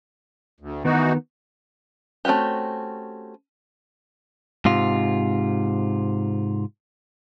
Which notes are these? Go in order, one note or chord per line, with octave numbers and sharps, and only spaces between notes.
D2
D#3 E3 B3 D#4 F#4
A3 C4 C#4 F#4 G4
G#2 C3 F4